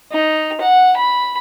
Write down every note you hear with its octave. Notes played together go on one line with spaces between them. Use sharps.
D#4
F#5
B5